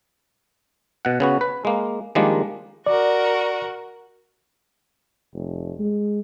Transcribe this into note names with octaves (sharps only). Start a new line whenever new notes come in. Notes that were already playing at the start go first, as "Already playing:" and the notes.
B2 F#5
C#3 B3 F#4
B4
G#3 A#3
D#3 F3 G3 G#3 A#3 D4
F#4 A#4 D5
F1
G#3